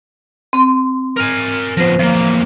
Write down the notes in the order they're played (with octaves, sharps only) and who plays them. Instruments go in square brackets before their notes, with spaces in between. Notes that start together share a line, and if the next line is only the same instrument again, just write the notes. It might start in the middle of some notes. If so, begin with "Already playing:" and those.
[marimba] C4 C6
[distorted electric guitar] A#4 G#5
[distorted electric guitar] F3 B3 [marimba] C5 A#6
[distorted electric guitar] E2 A#3 [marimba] F3